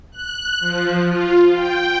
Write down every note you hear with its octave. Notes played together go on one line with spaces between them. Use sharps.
F#6
F3
F4
G5